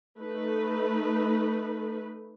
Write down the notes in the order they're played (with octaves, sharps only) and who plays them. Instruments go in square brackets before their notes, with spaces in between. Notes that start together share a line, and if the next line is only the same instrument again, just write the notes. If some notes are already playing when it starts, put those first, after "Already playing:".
[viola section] A3 D#4 B4